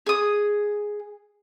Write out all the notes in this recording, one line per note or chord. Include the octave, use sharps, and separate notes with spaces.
G#4 D#6